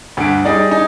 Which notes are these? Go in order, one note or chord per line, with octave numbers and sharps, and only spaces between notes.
D2 G2 D7
G3 D#4 G#4 D5
D#4 G#5